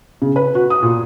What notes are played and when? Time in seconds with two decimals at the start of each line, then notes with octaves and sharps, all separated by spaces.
0.22 C#3
0.36 B4
0.55 F#4
0.70 D#6
0.83 A#2